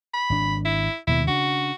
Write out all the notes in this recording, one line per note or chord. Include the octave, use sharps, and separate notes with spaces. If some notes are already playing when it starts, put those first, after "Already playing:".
B5
G#1 D4
E4
D#2 B2 D#3 E4
C#3 D4 F#4